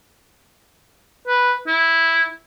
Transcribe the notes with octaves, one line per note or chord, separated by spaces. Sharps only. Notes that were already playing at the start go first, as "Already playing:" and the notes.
B4
E4